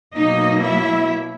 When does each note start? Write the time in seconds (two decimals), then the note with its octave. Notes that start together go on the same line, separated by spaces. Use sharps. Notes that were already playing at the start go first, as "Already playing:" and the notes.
0.15 B2 F#3 A#3 D#4 D#5
0.64 E4 E5